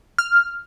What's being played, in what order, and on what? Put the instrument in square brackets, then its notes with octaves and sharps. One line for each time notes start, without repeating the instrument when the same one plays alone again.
[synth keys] F6